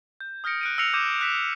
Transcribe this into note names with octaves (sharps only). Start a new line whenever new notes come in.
G6
D#6 F6 G6 A#6 C#7 D7
F#6 D7 D#7
E6 F6 A#6 C7 C#7 F7
D6 E6 G6 D#7 E7
F#6 B6 E7